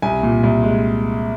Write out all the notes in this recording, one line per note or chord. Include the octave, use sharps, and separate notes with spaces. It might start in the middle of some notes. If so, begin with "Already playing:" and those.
C2 G#5
A#2
C2
G#3